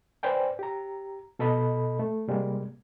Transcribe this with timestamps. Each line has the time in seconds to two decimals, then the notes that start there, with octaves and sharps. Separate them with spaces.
0.23 B4 C5 D5 G5 G#5
0.59 G4 A#5
1.39 B2 A4 D#5 B5
1.99 A3
2.28 C3 G3 G#3 A#3